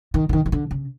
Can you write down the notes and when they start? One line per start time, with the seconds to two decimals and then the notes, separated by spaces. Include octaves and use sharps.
0.14 D#3
0.29 D3
0.33 D#3
0.46 D#3
0.52 D3
0.71 C#3